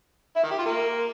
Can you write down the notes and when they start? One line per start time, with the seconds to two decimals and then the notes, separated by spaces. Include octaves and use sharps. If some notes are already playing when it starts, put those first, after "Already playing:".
0.36 E4
0.43 D#3
0.51 G4
0.58 F4
0.66 A#3